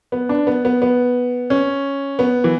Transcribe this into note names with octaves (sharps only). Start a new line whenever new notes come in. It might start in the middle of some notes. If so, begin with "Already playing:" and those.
B3
D4
B3
B3
B3
C#4
B3
E3